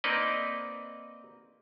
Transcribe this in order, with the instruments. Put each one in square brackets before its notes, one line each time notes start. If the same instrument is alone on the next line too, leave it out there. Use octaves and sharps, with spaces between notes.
[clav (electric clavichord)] A#3 C4 D#4 B4 D5 D#5